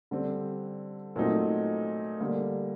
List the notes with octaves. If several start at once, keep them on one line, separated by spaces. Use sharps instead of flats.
D3 G3 C4
A#2 F#3 A3 C4 D#4
D3 G3 A#3